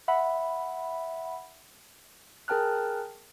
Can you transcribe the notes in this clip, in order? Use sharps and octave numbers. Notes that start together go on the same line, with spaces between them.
E5 F#5 B5
G#4 A#4 G5 A5 F6 F#6